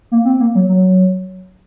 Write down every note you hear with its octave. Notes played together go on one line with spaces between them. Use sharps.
A#3
C4
A#3
F#3
F#3